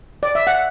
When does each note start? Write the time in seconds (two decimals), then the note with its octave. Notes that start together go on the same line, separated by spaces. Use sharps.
0.23 D5
0.35 E5
0.47 F#5